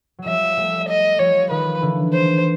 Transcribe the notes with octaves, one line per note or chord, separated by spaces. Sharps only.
F#3
F3 G3 E5
G3 A3
D#5
F3 G3 C#5
D#3 F3 B4
D3 E3
C5